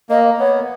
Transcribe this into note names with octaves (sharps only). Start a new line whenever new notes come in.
A#3 D#5
B3 C#5